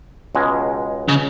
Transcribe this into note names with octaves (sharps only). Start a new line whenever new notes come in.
C#2 B2 G#3
C#3